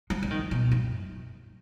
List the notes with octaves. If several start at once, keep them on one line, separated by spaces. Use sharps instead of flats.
F3
F3
D#3
B2
F#2